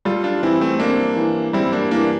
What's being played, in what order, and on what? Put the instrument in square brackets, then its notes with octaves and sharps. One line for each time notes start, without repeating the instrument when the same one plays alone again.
[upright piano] G3 [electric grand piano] F4 A4
[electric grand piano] D4 F4
[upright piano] E3 [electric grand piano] C4 E4
[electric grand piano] A3 C4
[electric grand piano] A#3 D4 [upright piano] C4
[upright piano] E3
[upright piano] G3 [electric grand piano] C4 E4
[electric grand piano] A#3 D4
[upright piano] E3 [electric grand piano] A#3 D4